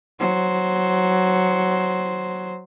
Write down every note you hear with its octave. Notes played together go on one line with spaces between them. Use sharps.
F#3 C5